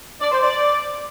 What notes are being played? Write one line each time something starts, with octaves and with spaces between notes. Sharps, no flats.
D5
C5
D5